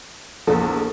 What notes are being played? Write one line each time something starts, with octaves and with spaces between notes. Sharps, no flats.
A#1 E2 A#3 A4